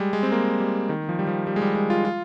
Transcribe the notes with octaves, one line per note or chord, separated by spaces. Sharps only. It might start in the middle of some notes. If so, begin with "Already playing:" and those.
Already playing: G3 G#3
G#3
C4
A#3
G3
D#3
F3
G3
F3
G3
G#3
G3
G#3
F4
F4